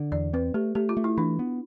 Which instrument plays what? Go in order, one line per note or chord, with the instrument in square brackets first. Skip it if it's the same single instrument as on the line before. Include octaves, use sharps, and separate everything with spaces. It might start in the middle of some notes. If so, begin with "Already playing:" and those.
Already playing: [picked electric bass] D3
[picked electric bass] E2 [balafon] D5
[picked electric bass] C4 [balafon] B4
[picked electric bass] A3 [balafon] G4
[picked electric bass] A3 [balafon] G4
[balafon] F4
[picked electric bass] A3
[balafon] E4
[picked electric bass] E3 [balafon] D4
[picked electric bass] B3